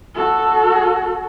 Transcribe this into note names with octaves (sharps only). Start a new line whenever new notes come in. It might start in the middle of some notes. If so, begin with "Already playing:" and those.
F#4 A4